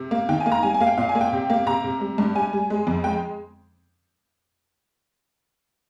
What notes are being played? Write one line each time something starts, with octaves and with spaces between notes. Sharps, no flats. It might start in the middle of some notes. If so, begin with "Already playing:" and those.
Already playing: C3
A#3
D#3 G5
G#5
A#3
A#5
G3 G#5
G#5
A#3 F5
G5
A#2 F5
G#5
A#3
G5
C3
A#3
C3 A#5
C3
G3
G2
G3 G#5
G3
G#3
F2
G#3 G5